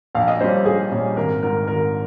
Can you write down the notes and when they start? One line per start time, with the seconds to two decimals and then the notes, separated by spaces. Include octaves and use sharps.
0.15 A#1 F5
0.28 D#5
0.40 A#2 G3 C#4 C5
0.65 A#1 G#4
0.92 A#2 G3 C#4
1.17 G#1 A#4
1.42 G#2 D#3 A#4
1.67 G#1 A#4